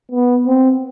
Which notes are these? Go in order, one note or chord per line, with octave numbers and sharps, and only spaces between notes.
B3
C4